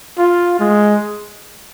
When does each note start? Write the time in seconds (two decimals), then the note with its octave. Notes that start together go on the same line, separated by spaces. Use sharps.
0.18 F4
0.60 G#3